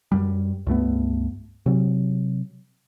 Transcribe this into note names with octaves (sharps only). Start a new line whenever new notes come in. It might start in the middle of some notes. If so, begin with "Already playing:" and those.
F#2 G3
C#2 G2 A3 B3
C3 F#3